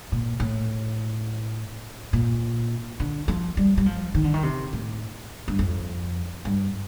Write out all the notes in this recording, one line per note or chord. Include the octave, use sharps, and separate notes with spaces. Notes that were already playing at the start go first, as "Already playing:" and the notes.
A#2
A2
A#2
D3
F3
G3
G3
F3
D#3
D3
D#3
C3
A2
G2
F2
G2